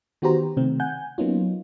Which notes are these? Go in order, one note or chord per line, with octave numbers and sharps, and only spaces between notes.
D#3 B3 F#4 G4 C5 A#5
C3 D#3 A3 C4
F#5 G#5 G6
F#3 A#3 B3 C#4 D#4 F4